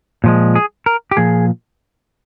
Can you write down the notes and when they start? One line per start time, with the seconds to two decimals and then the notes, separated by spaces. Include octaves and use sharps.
0.24 A#2 F3 G#3
0.55 G#4
0.86 A#4
1.11 G4
1.17 A#2 F3 G#4